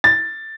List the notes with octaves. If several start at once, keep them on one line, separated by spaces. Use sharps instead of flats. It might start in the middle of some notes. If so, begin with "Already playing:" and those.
A6